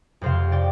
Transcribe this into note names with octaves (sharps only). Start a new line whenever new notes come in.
F2 C3 C5 F5
D5 G5